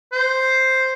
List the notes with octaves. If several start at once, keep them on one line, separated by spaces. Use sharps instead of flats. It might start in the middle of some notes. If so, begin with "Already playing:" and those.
C5